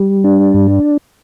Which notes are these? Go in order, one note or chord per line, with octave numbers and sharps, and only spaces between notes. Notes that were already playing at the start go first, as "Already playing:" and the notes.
Already playing: G3
D4
G2